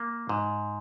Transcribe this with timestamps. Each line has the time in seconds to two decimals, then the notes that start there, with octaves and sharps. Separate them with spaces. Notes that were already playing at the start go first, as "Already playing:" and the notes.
Already playing: A#3
0.29 G#2